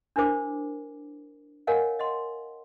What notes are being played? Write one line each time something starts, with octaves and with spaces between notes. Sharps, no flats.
D4 E4 A#4 C5 D6
A#4 C#5 D#5 F5 F#5 G#5
D#5 F#5 C6